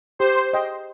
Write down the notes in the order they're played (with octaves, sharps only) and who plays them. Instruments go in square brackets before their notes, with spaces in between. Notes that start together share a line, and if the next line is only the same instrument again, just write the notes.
[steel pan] G4 [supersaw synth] C5
[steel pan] D#5 G5